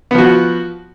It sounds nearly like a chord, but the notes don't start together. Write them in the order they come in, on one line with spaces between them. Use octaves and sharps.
B3 F3 F#4